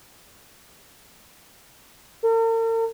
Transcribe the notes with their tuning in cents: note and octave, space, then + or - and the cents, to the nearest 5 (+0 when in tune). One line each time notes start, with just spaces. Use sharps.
A#4 -45